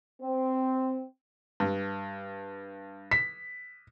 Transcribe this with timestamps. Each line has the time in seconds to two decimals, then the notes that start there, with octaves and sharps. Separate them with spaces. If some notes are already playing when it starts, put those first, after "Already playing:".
0.22 C4
1.60 G2
3.11 B6